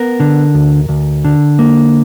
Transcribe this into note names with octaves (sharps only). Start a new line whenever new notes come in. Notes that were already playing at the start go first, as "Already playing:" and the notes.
Already playing: B3 A#4
D3
D2
D2
D3
A#3